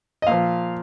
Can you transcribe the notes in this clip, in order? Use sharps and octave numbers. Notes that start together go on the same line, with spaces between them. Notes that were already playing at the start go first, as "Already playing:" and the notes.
D#5
A#2 F3 F5